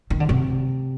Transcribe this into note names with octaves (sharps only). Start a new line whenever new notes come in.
D#3
D3
C3